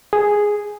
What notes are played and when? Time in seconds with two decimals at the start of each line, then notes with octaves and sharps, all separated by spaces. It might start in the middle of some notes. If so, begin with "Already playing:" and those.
0.13 G#4